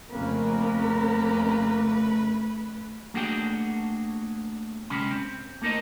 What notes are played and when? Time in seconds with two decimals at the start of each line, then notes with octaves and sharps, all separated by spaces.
0.12 F2 C#3 A3 A#3 C4 A#4 B4
3.14 A3 A#3 D4 F#4 G#4 G5
4.90 C3 G#3 C#4 B5
5.11 C4
5.62 A3 A#3 D#4 A#4 C5 D#5